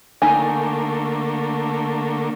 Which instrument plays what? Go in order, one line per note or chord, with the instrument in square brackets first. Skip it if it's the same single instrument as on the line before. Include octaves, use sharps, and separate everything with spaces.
[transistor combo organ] D3 A3 A#3 [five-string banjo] D#4 G#5